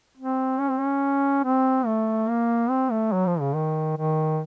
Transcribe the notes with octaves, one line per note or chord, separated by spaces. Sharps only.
C4
C#4
C4
C#4
C4
A3
A#3
C4
A3
F#3
F3
C#3
D#3
D#3